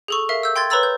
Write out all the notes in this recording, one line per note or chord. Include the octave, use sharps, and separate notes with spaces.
G#4 A4 C#6
A#4 E5 F5
E6 G6
G5 C6 G#6 A6
B4 C#5 A#5 B5 E6 A6
G6